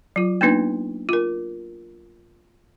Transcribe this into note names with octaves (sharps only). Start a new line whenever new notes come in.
F#3 F4
A#3 B3 D4 D#4 B4
F4 A#4